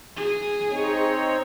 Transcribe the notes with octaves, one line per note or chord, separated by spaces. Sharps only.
G#4
C4 D#4 C#5